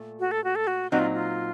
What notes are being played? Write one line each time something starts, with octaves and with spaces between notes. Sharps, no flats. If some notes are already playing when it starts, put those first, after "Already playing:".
Already playing: A#2 A3
F#4
A4
F#4
A4
F#4
A#2 F#3 C4 D#4 F#4
F4
F4